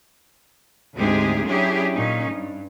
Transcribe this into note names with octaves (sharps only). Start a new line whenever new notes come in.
D2 G#2 G#3 C4 G4 G#4
F#3 C#4 D4 E4 G4 G#4
A#2 C#4 D#4
G2